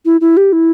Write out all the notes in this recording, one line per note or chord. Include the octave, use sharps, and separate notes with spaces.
E4
E4
G4
E4